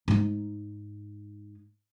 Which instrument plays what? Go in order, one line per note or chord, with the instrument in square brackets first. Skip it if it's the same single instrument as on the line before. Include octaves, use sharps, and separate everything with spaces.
[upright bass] G#2 D#4